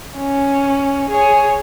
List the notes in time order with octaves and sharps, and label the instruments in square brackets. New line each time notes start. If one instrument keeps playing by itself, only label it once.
[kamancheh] C#4
G#4 C#5